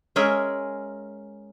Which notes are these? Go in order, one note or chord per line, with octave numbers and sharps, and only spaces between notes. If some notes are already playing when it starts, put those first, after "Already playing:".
G#3 C#4 G#4 A#4 E5